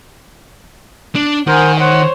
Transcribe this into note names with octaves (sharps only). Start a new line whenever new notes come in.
D4
D#3 A#4 C5 F#5 G#5
C5 C#5 F#5